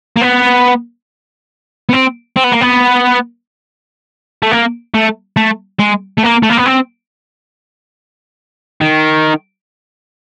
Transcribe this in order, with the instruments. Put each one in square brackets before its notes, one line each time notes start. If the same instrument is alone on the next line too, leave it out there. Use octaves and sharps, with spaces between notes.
[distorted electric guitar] A#3
B3
B3
C4
C4
B3
A#3
B3
A3
A#3
A3
A3
G#3
A3
A#3
A3
A#3
B3
C4
D#3